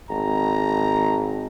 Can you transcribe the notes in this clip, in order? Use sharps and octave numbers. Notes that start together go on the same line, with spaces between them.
G#1 A#5